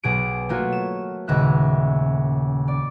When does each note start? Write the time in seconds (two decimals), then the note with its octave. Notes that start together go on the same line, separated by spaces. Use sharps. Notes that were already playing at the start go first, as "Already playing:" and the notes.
0.04 B1 B2 G#4 D7
0.49 A3 A#3 F4 F#4 C#5
0.73 E7
1.28 D#1 C#2 E5 F#6
2.68 D5